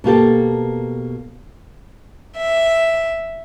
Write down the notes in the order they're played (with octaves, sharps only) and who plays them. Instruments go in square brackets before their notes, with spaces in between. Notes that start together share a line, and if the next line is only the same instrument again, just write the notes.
[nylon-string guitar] B2 A#3 G4 A4
[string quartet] E5